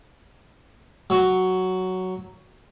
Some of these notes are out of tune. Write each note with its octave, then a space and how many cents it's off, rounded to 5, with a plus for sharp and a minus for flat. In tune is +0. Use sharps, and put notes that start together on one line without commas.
F#3 +5